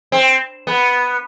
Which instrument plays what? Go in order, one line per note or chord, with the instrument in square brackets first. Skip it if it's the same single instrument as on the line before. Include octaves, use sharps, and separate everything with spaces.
[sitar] C4
B3